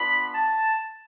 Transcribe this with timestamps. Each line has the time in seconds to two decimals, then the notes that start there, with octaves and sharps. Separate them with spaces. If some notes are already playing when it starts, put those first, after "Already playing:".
Already playing: B3 D4 F4 B5
0.34 A5